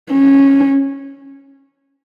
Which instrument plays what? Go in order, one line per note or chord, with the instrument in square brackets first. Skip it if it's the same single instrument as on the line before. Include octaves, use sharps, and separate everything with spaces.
[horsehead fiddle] C#4